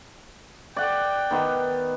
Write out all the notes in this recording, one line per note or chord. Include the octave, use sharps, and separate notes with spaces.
D5 F#5 G5
D#3 B3